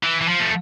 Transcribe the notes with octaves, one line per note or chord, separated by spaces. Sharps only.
E3
E3
F3
A3